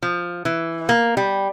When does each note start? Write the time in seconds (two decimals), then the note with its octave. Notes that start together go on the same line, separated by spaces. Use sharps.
0.02 F3
0.45 E3
0.89 A#3
1.17 G3